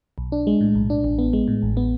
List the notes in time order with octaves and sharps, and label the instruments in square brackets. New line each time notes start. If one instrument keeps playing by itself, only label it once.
[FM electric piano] B1
D4
G#3
A2
B1
D4
A1
B3
G#3
A2
A1
B3